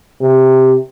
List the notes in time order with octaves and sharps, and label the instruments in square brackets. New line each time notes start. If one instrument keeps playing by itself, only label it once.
[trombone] C3